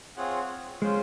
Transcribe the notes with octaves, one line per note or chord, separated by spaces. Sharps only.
C4 F4 G#4 C#5 F#5
G#3 C#4 F4 C5